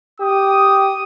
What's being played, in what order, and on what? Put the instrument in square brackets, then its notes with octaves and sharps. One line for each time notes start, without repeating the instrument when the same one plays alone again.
[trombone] G4 [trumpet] D#6